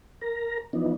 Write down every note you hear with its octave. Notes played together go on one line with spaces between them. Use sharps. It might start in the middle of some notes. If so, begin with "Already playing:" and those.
A#4 A#5
E3 F3 B3 D4 D#4